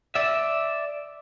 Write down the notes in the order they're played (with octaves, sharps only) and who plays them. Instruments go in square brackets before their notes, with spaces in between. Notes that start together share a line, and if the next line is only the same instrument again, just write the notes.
[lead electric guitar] D5 E5